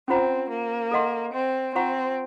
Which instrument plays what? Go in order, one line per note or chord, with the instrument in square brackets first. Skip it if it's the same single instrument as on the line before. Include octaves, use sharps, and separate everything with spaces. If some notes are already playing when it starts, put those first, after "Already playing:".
[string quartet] C4 [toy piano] C#4 F4 C5 F#5 A#5
[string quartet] A#3
[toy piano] A4 D#5 F#5 C6
[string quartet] C4
[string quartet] C4 [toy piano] F4 C5 F#5 A#5 C#6